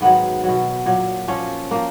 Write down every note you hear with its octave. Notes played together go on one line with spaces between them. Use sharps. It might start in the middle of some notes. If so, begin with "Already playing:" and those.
G#2 D#3 F#3 B3
B2 F#3
A#2 F#3
A#2 F3 C#4
F3 A#3